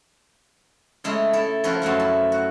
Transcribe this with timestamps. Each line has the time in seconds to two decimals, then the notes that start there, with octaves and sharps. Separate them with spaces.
1.04 C#3 G#3 A3 E4 A#5 C6
1.33 E4 A4
1.64 F3 C#4 E4 F#4 A#4
1.82 F#2 F3 A3 F#4
2.00 E4
2.32 F#4